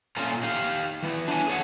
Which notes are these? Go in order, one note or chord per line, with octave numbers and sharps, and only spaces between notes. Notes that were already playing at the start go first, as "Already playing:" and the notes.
A#2 A3 C#4 F4 A#4
D#4 G4 F5
E3 B3 E4
D4 E4 C#5 F#5 G#5
G#4 A4 C#5 F#5